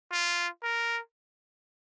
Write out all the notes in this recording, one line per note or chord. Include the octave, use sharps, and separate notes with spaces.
F4
A#4